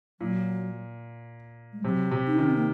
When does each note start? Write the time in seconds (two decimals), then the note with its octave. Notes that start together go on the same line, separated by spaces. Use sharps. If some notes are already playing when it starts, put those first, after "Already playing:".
0.20 A#2 F#3
1.73 G#3
1.84 C3 F#3
2.11 C3
2.27 D#4
2.37 D#3 C#4
2.47 C4
2.56 A#3